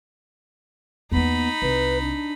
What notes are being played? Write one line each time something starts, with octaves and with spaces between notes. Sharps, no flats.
E2 A#3 B3 D#4 B5
C2 B4
D4